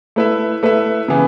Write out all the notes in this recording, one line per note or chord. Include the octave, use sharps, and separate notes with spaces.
A3 E4 B4 E5
A3 E4 B4 E5
C#3 E3 B3